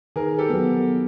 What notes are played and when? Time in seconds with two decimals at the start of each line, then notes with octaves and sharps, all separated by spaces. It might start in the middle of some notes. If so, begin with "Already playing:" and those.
0.16 D#3 G#4 A#4
0.38 G4 A4
0.50 F#3 B3